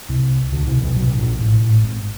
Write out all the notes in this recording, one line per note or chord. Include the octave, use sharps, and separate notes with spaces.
C2 C3
D2 D3
C2 C3
B1 B2
B1 B2
B2
A#1 A#2
A1 A2
A1 A2
G#1 G#2